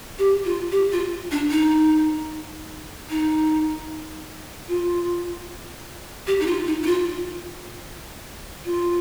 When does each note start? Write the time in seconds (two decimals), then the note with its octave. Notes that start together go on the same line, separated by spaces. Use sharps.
0.19 G4
0.45 F4
0.72 G4
0.92 F4
1.31 D4
1.51 D#4
3.10 D#4
4.69 F4
6.27 G4
6.40 D#4
6.46 F4
6.67 D#4
6.82 D#4
6.86 F4
8.65 F4